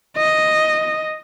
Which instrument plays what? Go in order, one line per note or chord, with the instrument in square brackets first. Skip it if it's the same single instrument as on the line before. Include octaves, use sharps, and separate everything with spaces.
[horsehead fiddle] D#5